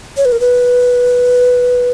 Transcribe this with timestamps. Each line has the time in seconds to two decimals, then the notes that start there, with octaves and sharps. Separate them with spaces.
0.17 C#5
0.25 B4
0.32 A#4
0.40 B4